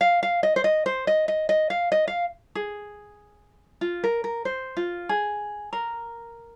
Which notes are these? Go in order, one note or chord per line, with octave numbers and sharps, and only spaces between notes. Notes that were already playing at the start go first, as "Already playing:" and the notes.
F5
F5
D#5
C5
D#5
C5
D#5
D#5
D#5
F5
D#5
F5
G#4
F4
A#4
A#4
C5
F4
G#4
A#4